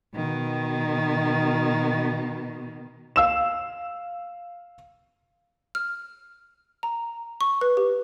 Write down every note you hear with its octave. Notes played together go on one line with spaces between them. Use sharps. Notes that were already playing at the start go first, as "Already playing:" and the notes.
B2 D#3
F5 E6 E7
F6
A#5
C#6
B4
G4